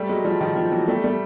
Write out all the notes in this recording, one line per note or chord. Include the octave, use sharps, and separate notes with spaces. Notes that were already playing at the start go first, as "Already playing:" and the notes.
Already playing: G3 A3
F#3 G#3
F3 G3
D#3 F3
D#3 F3
E3 F#3
G3 A3
G3 A3